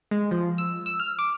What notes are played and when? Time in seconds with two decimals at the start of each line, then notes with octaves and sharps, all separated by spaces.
0.11 G#3
0.31 F3
0.58 E6
0.86 E6
1.00 F6
1.19 D6